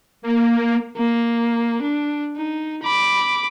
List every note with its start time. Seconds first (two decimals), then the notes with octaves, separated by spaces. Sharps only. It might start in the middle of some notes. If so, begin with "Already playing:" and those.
0.22 A#3
0.96 A#3
1.82 D4
2.36 D#4
2.83 B5 D6